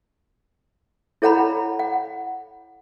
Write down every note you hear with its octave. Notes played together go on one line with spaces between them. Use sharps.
E4 A4 C#5 F#5 A#5 B5
F#5